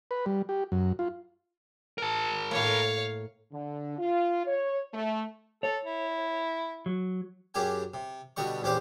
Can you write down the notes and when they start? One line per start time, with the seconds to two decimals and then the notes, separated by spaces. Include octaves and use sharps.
0.11 B4
0.26 G3
0.49 G4
0.72 F#2
0.99 F4
1.98 A#4 A5
2.51 A2 A#3 C#5 F5
3.52 D3
3.99 F4
4.46 C#5
4.94 A3
5.63 A4 C#5
5.85 E4
6.86 F#3
7.54 F#2 C#4 G4 G#4 G#5
7.94 C3
8.37 B2 D3 G3 D#5 C#6
8.62 A#1 E2 C#4 G4 C5 D5